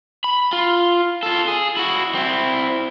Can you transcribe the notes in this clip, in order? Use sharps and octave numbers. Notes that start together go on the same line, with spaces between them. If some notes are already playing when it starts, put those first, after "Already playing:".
B5
F4
F4 A4
G#4
E4 F#4
C4 E4